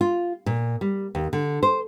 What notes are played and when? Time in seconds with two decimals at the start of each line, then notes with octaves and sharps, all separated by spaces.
0.01 F4
0.46 A#2
0.81 G3
1.15 D#2
1.33 D3
1.63 C5